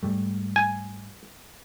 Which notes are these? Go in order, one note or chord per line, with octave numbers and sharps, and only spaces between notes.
G#2 G3 A3
G#5